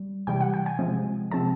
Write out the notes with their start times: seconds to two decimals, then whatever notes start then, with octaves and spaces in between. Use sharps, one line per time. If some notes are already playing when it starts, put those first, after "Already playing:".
Already playing: G3
0.27 C3 E3 G3 G5
0.41 F#5
0.54 G5
0.66 G#5
0.79 C3 F3 G#3 C4
1.31 C3 F3 G#3 C4 A5